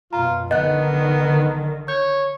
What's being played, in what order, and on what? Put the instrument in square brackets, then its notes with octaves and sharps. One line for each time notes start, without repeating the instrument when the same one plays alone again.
[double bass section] F#2 B2 [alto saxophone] F4 [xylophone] A#5
[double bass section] A#1 D3 [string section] D#3 [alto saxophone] B3 [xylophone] D#5 F#6
[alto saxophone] C#5 [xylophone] G6